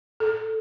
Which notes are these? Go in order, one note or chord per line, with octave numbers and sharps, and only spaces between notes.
A4